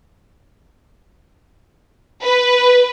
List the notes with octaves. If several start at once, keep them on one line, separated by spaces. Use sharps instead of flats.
B4